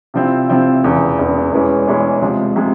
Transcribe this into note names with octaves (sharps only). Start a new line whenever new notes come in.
C3 F3 C4 E4
C3 F3 C4 E4
E1 E2 C#3
E1 E2 C#3
E1 E2 E3 G#3 C#4
E1 E2 E3 G#3 C#4
C3 F3 G#3
C3 F3 G#3